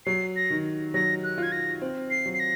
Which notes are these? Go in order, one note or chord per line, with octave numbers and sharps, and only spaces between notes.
F#3 C7
A#6
D#3
F#3 A#6
F#6
F4 G#6
A#6
C4
C7
F#3
C7
A#6